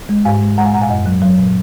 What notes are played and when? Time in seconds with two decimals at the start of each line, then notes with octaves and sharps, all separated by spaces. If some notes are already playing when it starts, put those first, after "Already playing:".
0.09 G#3
0.25 G#2 F5 G#5
0.41 G#3
0.58 G#3 F#5 A#5
0.65 F5 G#5
0.74 A#2 F#5 A#5
0.81 F5 G#5
0.89 F#2 D#5 F#5
1.06 F#3
1.22 F#3
1.38 A#2